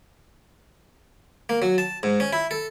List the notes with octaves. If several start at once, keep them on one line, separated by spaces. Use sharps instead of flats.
A#3
F#3
A5
G#2
C#4
E4
A4